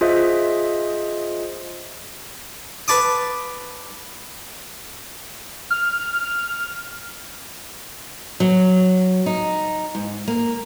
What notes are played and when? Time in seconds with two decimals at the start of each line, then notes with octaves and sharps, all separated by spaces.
0.01 F4 G#4 C5 D#5 E5
2.88 B4 A5 D6 D#6
5.70 F6
8.40 F#3
9.26 D#4
9.95 G#2
10.28 A#3